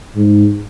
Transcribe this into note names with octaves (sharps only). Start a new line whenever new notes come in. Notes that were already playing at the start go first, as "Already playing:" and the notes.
G#2